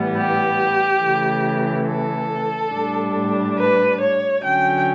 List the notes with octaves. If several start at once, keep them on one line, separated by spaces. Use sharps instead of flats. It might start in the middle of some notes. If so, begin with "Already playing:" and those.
Already playing: A2 E3 G3 B3
G4
C#3 E3 A3
A4
A2 G3 D4
B4
C#5
D3 F#3 C#4 G5